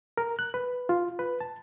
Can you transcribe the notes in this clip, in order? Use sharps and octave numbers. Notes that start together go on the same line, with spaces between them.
A#4
F#6
B4
F4
B4
A5